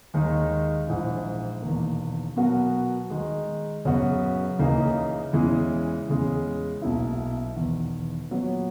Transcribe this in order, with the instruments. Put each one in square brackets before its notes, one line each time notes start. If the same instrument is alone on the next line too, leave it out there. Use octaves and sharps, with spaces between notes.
[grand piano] D#2 D#3 G#3 D#4
A#1 G#2 E3
E1 E2 D#3 A#3
B2 F#3 B3 F#4 A#4
D#3 G#3 D#4
F#2 C#3 F#3 B3 F#4
C#2 C#3 E3 A#3 D#4
E2 C#3 E3 G#3
E2 C#3 G#3
B1 B2 A#3 E4
E1 E2 D#3
A#2 F#3 B3 F#4 C#5